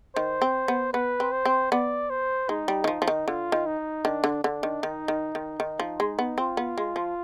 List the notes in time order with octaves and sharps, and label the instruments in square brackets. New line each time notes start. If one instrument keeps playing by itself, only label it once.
[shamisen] D#3 [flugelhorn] C5
[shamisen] C4
B3
[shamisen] B3 [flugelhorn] B4
[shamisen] C4
[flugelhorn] C5
[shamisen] C4
[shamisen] B3 [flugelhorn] D5
[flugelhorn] C5
[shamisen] G#3 [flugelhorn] D#4
[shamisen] G3
D#3
[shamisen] F3 [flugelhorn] D#4
[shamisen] F3
D#3
[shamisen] D3 [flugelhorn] F4
[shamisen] D#3
[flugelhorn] D#4
[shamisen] D#3 [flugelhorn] D4
[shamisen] D3
[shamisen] D3 [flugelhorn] D4
[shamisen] D#3
[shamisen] D#3 [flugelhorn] D#4
[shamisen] D#3
D#3
D#3
F3
G#3
B3
[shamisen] C4 [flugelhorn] F4
[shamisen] B3
G#3
F3